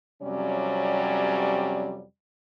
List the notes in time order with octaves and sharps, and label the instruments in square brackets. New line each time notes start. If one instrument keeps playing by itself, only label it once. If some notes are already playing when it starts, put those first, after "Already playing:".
[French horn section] F2 C3 F#3 G3 C#4 D5